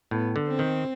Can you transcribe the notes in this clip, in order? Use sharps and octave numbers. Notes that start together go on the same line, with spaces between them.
A2 B3
D3
C4
D#3